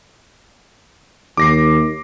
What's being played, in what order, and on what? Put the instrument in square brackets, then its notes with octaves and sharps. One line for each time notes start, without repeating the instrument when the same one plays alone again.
[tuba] D#2 [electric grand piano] D6 A#6 C7